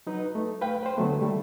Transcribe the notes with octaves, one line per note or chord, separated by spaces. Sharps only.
F#3 D#4 B4
A3
B4 F5 G5
B4 C5
D3 F#3 A3 B3
D#3 G3 A3